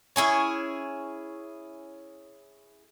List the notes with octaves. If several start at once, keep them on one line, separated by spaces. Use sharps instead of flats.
C#4 E4 G#4 C#5